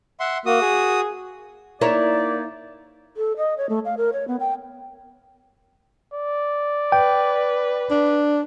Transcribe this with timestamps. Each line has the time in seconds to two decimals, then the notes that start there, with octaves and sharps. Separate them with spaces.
0.20 E5 F#5 C6
0.46 A#3 F#4 D#6
0.61 G#4
1.81 A#3 D#4 E4 A#4 C#5 D5
3.17 A4
3.37 D#5
3.58 C#5
3.69 A3
3.85 F5
3.97 A#4
4.13 C#5
4.28 B3
4.40 G5
6.13 D5
6.92 B4 G5
7.91 D4